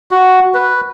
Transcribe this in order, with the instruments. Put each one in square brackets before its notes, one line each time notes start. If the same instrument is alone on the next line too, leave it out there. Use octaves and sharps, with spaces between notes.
[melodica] F#4
B4